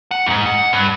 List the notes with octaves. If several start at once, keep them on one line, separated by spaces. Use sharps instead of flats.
F#5
E2 G#2
F#5
G2